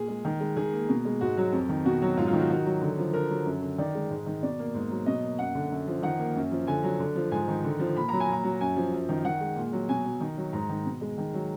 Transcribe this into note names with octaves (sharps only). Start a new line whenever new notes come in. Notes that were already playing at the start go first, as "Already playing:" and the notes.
Already playing: A#2 G#4
G#3
D#3
G#3
D#3 G#4
A#3
B2
G#3
G#2 F#4
F#3
F2
D#3
B2 F#4
F#3
G#2 F4
F4
D#3
F#4
D#3 F#4
F#3
D3
F3
D3 A#4
F#3
F#2
D3
D#3 D5
G#3
G#2
D#3
B2 D5
A#3
G#2
F#3
B2 D#5
A#3
F#2 F#5
D3
F#2
F3
D#3 F#5
A#3
F#2
F3
D3 G#5
F#3
D3
F3
G#2 G#5
D#3
D3
F3
A#2 B5
F#3 A#5
G#5
A#2 A#5
F#3
F#2 G#5
F3
F#2
D#3
D#3 F#5
G#3
A#2
F#3
B2 G#5
F#3
D#3
F#3
G#2 A#5
D#3
B2
G#3
D#3
F#3